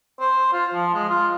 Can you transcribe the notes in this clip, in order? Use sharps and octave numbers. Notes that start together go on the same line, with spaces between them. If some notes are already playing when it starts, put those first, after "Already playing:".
C5
F4
F3
G#3
F4